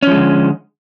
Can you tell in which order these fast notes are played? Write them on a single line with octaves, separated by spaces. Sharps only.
C#4 F3 G#3 D3